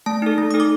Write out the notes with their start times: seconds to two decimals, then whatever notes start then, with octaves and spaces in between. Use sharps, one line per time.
0.06 A3 A5
0.22 D#4 A4
0.38 A3
0.51 D#4 A4 D#6
0.60 D6